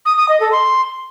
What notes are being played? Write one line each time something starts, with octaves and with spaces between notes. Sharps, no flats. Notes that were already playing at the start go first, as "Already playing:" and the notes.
D#6
D#6
D#5
A4
C6